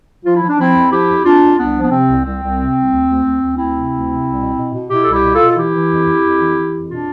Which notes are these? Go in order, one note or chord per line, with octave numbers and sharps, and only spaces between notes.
F3 F4
E4
F3
D4
F3 C4 E4
F2
F3 E4 G4
F2
F2 D4 F4
F2
C2 B3 D4
F3
B3
C3 C4
C2
C2 C4
C2
C3
C2
D2
D2
D2
D2
D2 C4 E4
C3
D2
C3
C2
B2
B2
B2
B2 E4 G4
C2 A4
E4 G4
B2
F4 A4
B2
A4
E3 E4 G4
E3
F2
F2
F2
E3
E3
F2
B2 D4 F4